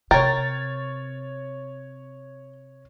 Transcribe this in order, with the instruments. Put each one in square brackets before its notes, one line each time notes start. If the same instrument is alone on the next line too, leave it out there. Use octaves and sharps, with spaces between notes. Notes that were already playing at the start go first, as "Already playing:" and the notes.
[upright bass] C3 [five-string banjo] A#4 G5 [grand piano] C#5 A6